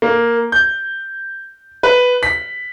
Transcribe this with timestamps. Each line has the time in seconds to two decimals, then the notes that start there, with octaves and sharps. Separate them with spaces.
0.02 A#3
0.52 G6
1.83 B4
2.23 B6